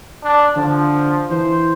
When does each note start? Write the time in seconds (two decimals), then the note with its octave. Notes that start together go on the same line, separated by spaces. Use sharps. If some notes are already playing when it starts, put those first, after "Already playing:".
0.24 D4
0.56 D3 F3
1.30 E3 C5